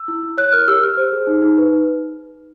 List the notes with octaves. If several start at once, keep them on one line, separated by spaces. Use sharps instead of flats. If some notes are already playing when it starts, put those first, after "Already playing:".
Already playing: E6
E4
E4
C#5 F#6
A#4 F6
G4 E6
G4 F6
C5
G#4
D#4
D#4
B4